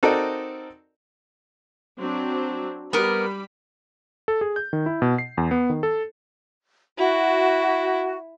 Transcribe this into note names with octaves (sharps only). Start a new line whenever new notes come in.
C4 D#4 F#4 A4 A#4 D5
F#3 C4 D4
G3 B3 A#4 B5
A4
G#4
G6
D#3
E4
B2
C7
E2
B3
D#3
A4
E4 F#4